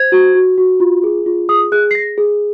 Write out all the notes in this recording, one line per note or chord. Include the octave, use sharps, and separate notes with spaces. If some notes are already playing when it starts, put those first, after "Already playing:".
Already playing: C5 G#6
F#4
F#4
F#4
F4
G#4
F4
G#4 D#6
G#4 F#6
C7
G#4 A#6
G#4